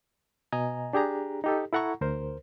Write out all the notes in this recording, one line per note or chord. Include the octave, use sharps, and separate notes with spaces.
B2 D#5 G#5 A#5
D4 G4 G#4 A#5
D#4 G4 A4
E4 A4 F#5 A#5 C#6
D2 A#4 C5